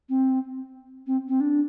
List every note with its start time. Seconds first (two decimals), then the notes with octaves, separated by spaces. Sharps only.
0.09 C4
1.07 C4
1.28 C4
1.40 D4